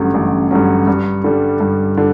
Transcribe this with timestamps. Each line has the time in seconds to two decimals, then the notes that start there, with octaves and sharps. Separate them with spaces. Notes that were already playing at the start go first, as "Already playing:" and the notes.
Already playing: A1 G2 D3 F#3 C#4
0.14 A1
0.51 G2 D3 F#3 C#4
0.87 G2
1.24 D3 G3
1.60 G2
1.97 D3